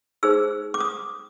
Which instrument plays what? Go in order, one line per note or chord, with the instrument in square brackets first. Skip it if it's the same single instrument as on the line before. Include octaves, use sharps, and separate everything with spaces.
[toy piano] D#4 G#4 C5 E6
D6
D#6